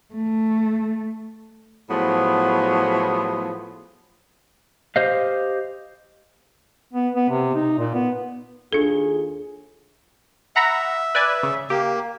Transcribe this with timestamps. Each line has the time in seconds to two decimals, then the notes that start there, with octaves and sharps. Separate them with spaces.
0.14 A3
1.90 A2 F3 F#3 B3 G#4
4.96 G4 C5 D#5 F5
6.93 B3
7.15 B3
7.29 C3
7.55 D#4
7.78 A#2
7.94 B3
8.73 D#2 D4 F4 G#4 A4
10.56 E5 F#5 A#5 B5
11.15 B4 D5 G#5
11.43 C#3
11.70 A#3 G4